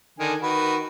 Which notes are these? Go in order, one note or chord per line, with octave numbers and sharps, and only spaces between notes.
D3 D#3 G#5
D#3 F#4 B4